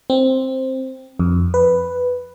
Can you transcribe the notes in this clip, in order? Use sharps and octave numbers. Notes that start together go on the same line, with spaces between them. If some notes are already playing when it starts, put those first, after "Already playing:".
C4
F2
B4